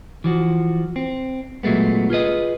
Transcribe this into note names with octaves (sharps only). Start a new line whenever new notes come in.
E3 F3 F#4
C4
A#2 F#3 G#3 A3 B3
F4 G#4 B4 D#5